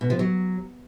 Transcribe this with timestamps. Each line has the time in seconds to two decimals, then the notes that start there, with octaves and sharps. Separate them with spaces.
0.01 B2
0.10 F3
0.19 F#3